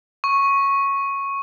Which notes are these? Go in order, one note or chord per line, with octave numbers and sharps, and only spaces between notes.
C#6